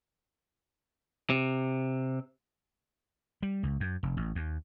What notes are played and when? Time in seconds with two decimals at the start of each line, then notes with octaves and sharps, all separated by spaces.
1.30 C3
3.43 G3
3.63 C#2
3.80 F#2
4.03 F1
4.17 A1
4.35 D#2